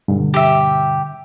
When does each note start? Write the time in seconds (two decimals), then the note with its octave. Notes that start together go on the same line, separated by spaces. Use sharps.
0.08 G2 B2 D3
0.34 G4 E5